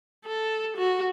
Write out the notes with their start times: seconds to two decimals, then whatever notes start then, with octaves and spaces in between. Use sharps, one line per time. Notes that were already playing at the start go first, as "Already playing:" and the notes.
0.25 A4
0.77 F#4